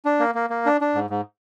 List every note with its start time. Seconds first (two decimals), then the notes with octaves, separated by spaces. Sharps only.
0.05 D4
0.20 A#3
0.35 A#3
0.50 A#3
0.66 D4
0.81 D4
0.95 G#2
1.10 G#2